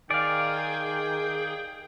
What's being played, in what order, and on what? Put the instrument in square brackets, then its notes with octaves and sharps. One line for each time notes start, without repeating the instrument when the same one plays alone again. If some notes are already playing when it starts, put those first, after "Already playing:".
[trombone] D#3 [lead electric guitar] G#4 [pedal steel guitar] D5 F5 [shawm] G5